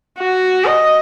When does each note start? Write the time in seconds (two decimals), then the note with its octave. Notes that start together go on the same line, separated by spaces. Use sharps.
0.19 F#4
0.66 D#5